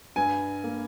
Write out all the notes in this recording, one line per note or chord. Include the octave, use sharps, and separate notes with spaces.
G2 G#5
A#3